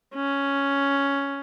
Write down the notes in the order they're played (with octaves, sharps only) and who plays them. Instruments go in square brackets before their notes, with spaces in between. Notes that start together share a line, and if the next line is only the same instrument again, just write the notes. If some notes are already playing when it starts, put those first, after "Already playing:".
[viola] C#4